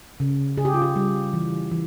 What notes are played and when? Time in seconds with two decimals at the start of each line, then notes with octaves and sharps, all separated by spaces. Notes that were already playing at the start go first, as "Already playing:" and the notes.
0.20 C#3
0.57 C#3 G#4
0.65 G4
0.74 F4
0.82 G4
0.96 G3
1.33 E3
1.71 E3